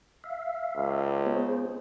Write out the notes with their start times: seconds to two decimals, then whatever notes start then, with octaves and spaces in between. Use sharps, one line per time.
0.24 E5 F5
0.76 C#2
1.26 B3 G#4 C5